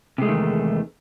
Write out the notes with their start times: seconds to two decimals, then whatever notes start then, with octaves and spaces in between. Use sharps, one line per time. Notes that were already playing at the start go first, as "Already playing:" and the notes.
0.18 C3
0.22 G#3
0.25 A3
0.28 D#3
0.32 E2